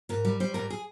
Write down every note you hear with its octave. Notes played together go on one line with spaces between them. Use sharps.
G#2 A#4
G3
G3 C5
G#2 A#4
G#4